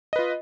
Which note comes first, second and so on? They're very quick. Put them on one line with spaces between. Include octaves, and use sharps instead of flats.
D#5 B4 F4